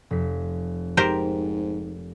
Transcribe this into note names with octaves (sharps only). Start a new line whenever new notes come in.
F1 B6
G#2 G4 A#4 C5